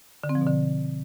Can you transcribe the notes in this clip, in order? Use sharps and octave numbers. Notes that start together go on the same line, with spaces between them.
D3
C4
F3
B2
D3